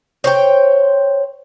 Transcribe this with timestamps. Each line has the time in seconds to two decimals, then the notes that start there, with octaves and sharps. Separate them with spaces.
0.24 C5 C#5 G5